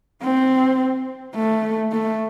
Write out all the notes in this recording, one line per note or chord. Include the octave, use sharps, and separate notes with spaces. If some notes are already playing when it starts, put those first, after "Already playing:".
C4
A3
A3